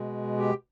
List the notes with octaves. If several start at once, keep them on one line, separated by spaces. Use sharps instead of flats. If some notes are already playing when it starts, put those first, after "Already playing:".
Already playing: B2 G#3
G4